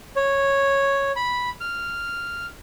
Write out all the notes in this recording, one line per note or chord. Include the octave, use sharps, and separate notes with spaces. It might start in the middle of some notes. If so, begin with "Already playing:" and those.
C#5
B5
F6